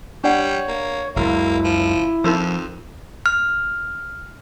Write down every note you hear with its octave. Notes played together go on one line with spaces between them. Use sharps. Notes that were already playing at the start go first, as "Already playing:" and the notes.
G3 D4 C#5 D5 F#5
A#3
F#1 C#2 A#3 E4
F3
F2 F3 D#4 A#4 E6
F6